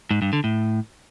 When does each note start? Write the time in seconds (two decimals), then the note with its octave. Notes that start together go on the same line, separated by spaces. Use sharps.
0.11 G#2
0.22 G2
0.33 D3
0.44 A2